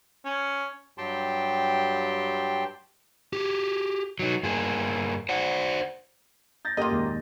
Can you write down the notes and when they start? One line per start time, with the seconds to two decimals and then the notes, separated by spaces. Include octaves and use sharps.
0.25 C#4
0.98 G2 F#3 G4 G5 A5 C6
3.33 G4 G#4
4.19 F#3 D#4
4.43 G2 A#3 G#4
5.29 C5 D5 F#5
6.65 G6 A6 A#6
6.77 F#2 A#3 F4 G4 D#5
6.90 D#2 A#2 G#3